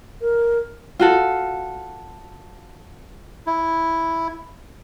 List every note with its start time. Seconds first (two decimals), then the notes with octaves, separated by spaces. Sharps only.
0.21 A#4
0.99 F4 F#4 A4
3.47 E4